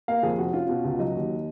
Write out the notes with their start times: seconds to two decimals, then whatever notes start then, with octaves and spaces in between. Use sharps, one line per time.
0.08 A#3 F5
0.23 F2 G#4
0.38 F1 F#4
0.53 C#4 F4
0.69 B2
0.84 C#2
0.99 F#3 D#5
1.15 D#2